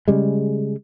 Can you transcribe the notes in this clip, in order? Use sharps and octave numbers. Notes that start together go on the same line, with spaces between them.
C#3 G3 G#3